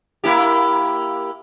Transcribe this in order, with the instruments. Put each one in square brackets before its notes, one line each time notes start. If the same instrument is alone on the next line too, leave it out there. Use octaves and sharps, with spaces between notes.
[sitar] A#3 E4 G4